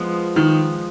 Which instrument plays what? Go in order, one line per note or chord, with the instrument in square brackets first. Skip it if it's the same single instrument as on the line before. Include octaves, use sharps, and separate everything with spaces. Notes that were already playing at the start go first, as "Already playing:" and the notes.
Already playing: [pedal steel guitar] F3 G#3 B3
[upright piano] D#3